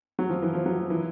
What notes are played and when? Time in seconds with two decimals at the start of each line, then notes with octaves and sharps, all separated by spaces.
0.19 F#3
0.29 F3
0.42 E3
0.54 F3
0.66 F#3
0.78 F3
0.90 E3